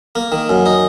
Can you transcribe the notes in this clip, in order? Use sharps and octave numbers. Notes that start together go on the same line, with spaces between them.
A#3
D#3
F#2
D#4